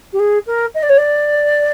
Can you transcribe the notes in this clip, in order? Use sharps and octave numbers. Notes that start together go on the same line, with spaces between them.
G4
G#4
A#4
D#5
D5
C#5
D5